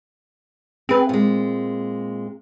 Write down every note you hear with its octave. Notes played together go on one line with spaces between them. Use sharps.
C4 G#4 B4
A#2 G#3